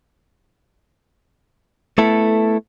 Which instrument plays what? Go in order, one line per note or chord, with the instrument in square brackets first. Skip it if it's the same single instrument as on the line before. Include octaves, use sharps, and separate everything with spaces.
[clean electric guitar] A3 B3 E4 A4